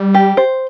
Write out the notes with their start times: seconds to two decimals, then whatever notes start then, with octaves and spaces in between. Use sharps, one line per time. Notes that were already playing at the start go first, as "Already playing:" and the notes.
Already playing: G3
0.15 G4
0.37 C5